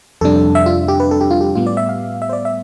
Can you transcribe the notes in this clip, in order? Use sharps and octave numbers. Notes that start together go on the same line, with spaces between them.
F2 C3 G3 D4 A4
E5
F4
G4
B4
A4
G4
F4
G4
A2 G3 B3 F4
D5
E5
F5
E5
C5
D5
E5